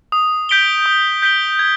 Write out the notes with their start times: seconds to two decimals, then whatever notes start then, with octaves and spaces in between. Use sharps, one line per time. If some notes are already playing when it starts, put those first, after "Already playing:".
0.12 D#6
0.49 G6 B6 D7 G7
0.86 D#6
1.22 G6 B6 D7 G7
1.59 G#6